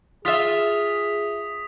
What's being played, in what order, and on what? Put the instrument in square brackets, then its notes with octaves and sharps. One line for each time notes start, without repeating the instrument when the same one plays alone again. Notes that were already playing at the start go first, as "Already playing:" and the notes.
[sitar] F4 E5 [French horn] G#4 [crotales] D#6 B6